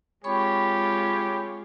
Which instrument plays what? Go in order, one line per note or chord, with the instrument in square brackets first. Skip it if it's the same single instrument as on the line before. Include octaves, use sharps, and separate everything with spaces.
[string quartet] G#3 F4 G#4 [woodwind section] C4 C#5 [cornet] G4 [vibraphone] B5 C#6